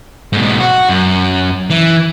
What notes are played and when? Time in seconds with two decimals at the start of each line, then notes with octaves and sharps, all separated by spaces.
0.33 G#2 B2
0.60 F#4
0.89 F#2
1.70 E3